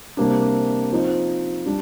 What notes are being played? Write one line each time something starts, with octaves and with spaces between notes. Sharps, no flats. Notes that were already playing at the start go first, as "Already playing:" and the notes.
C3 G3 A#3 D4
F3 C4 D#4
G3 D4